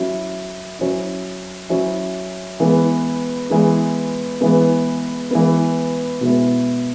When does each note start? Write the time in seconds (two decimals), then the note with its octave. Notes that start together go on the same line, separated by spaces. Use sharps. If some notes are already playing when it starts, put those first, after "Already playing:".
Already playing: F#3 C#4 E4
0.79 F#3 C#4 E4
1.69 F#3 C#4 E4
2.60 E3 G#3 B3
3.50 E3 G#3 B3
4.41 E3 G#3 B3
5.31 E3 G#3 B3
6.21 B2 G#3 B3 E4